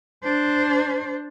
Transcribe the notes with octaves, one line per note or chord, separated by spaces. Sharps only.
D4 C5